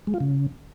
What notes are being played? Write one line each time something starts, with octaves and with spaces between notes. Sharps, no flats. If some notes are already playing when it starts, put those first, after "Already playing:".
G#3
F4
C#3